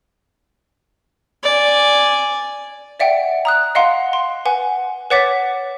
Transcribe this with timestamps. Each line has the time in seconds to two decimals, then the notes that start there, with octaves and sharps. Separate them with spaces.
1.43 D5 G#5
3.00 D5 E5 F#5 G5
3.45 A#5 D#6 F#6
3.75 D#5 F5 F#5 C6
4.13 C6
4.45 B4 F#5 G#5
5.10 B4 C#5 F#5 D6 A6 B6